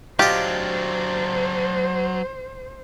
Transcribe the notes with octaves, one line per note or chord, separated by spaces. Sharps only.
F#3 D4 F4 G4 C5 D#5